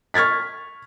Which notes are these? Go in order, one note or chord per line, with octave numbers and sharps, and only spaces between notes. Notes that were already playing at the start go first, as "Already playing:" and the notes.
C#6 F6 G#6 A6 B6